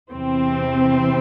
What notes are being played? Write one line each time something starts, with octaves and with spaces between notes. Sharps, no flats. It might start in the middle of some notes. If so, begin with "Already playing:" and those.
E2 C3 E3 C4